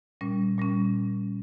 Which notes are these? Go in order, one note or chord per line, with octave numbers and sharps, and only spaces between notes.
A#2 G3 C#4
A#2 G3 C#4